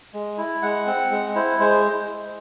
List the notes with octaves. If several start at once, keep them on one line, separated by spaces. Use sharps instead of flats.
G#3
E4
G#3 F#5
C4
G#3
E4 C5
G#3 C5